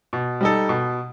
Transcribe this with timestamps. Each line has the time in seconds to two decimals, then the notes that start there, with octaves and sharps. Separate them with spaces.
0.13 B2
0.41 G3 D#4 A4
0.69 B2